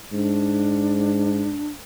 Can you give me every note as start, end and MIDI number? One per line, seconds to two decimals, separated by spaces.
0.12 1.57 44
0.12 1.69 62